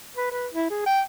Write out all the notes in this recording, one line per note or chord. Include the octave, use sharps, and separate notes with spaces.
B4
B4
E4
G#4
G5